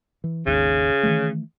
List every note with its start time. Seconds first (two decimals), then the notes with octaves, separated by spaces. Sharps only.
0.24 E3
0.46 G#1 D#2 C#3
1.03 D#3 E3 A3